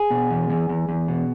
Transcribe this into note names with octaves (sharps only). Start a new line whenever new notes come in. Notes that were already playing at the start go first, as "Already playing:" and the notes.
Already playing: G#4
B2
E2
E2
E2
E2
B2